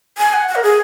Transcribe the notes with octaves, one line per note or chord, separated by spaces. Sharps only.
G#5
F#5
F#5
A#4
G#4